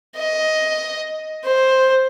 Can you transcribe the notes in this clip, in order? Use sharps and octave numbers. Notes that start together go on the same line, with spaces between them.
D#5
C5